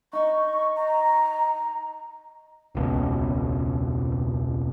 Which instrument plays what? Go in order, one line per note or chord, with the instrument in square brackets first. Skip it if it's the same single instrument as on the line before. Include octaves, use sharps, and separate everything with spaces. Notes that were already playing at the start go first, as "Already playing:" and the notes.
[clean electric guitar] D#4 [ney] C#6
[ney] A#5
[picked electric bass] E1 C#2 B2